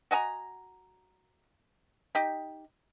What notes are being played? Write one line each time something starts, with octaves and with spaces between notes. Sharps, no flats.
F#4 D#5 G#5 A#5
D#4 G4